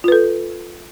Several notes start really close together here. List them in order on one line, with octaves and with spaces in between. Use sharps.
F4 B4 A4